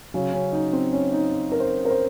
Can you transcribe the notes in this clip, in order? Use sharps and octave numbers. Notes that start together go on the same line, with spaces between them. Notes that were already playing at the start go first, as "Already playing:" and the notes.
C#3 F#3 C#4
C#4
D#4
C4
C#4
D#4
A#4
C5
A#4
C5